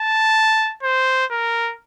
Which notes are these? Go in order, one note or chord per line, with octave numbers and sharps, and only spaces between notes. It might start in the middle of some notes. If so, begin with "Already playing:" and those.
Already playing: A5
C5
A#4